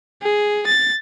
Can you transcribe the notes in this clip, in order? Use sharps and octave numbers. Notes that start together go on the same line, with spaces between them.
G#4
A6